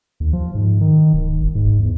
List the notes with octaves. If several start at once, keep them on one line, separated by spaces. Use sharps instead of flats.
D#2
F3
G#2
D#3
D1
G1
G#2
E2